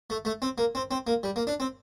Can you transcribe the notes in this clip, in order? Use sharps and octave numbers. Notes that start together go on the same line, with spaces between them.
A3
A3
C4
A#3
C4
C4
A#3
G3
A#3
D4
C4